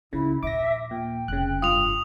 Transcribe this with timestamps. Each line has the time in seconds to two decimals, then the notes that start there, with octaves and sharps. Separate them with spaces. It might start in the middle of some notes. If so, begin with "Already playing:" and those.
0.13 C#2 C#3 E4
0.43 A#1 D#2 E5 D6 A#6
0.91 A#2 G5
1.28 F1 C#3 F#6
1.62 G2 F4 D#6 F7